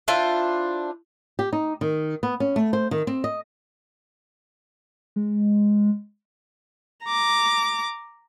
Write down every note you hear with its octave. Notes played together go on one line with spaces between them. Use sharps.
D4 E4 F4 C5
G4
D#4
D#3
B3
C#4
A3
C5
D#3
C4
D#5
G#3
A#5 D6